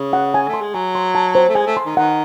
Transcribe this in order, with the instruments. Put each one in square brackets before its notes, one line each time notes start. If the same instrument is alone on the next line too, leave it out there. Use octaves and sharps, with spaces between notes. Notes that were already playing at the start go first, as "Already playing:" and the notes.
Already playing: [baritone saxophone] C#3
[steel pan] F#5
G#5
[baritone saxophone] A3
[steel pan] C6
[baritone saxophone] G#3
[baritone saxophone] F#3 [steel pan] G#5
[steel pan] C6
A5
C5
[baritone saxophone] A3
[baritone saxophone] G#3 [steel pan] G#5
[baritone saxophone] A3
[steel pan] C6
[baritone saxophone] D#3
[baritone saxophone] D#3 [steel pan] F#5